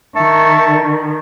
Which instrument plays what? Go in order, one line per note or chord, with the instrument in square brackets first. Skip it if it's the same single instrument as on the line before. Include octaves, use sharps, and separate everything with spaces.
[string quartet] D#3 [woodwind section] E5 A5 C#6